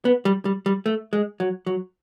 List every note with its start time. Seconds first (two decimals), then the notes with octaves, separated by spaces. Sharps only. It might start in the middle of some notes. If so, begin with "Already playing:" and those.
0.05 B3
0.25 G3
0.45 G3
0.66 G3
0.86 A3
1.13 G#3
1.40 F#3
1.66 F#3